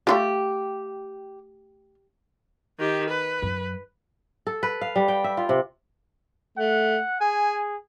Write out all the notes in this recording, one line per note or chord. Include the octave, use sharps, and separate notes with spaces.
A3 E4 F4 G4
D#3 G4
B4
F#2
A4
B4
F5
G3
G5
E5
F4
C3
A3 F#5
G#4 G#5